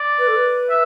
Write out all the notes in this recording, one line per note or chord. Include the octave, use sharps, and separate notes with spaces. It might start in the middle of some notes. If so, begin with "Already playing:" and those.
Already playing: D5
B4
A4
B4
E5